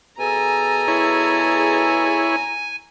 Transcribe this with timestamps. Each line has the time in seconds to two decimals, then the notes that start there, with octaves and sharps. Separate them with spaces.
0.19 B2 G#4 A4 G#5 A#5
0.88 E4 C#5